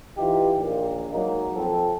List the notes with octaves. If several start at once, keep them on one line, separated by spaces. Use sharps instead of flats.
E3 D#4 F4 G4
A#1 D#2 A#2
F#3 G#3 A#3 D#4
F3 C4 A4